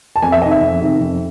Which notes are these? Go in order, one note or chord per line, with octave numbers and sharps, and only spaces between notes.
A5
F2 G#5
E5
C3 D#3 D#5
E5
F2
C3 D#3
F2